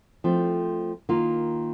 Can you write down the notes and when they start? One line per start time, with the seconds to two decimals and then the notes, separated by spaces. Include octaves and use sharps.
0.24 F3 A3 C4
1.09 D#3 A#3 F4